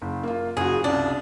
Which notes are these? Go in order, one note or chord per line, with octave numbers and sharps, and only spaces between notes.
F#1
A#3 F4
F#1 F#4 G#4
C2 C#3 D4